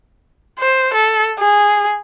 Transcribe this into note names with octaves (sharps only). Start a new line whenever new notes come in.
C5
A4
G#4